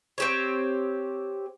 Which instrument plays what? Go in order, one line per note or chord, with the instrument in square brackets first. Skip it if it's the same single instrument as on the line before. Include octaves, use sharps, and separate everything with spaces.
[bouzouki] C4 G4 C#5